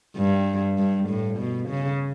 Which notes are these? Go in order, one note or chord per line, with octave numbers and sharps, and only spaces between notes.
G2
G2
A2
B2
C#3